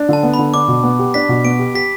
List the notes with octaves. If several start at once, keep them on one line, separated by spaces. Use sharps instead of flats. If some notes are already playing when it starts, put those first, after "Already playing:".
Already playing: D4
D3 A5
B3
B5
D3
D4 D6
B2
B3
G4
D4 B6
B2
B3 D7
G4
G4 B6